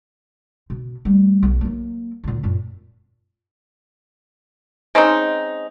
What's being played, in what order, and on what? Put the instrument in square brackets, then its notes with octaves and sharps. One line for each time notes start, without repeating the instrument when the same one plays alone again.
[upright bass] B2
G3 A3
B1
F#3 A#3
D2 A#2
F#2 A#2
[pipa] G#3 C4 C#4 D#4